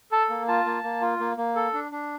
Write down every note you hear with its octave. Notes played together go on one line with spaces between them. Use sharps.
A4 A5
A#3
F4 A5
A#3
A#3
F4
A#3
A#3
A4
D4
D4